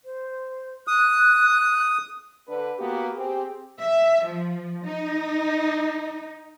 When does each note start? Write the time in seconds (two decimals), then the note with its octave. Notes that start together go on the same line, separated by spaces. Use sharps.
0.05 C5
0.88 D#6 F#6
2.47 D3 B4
2.78 A#3 B3 F#4 G4
3.16 C4 G4 G#4
3.79 E5
4.25 F3
4.85 D#4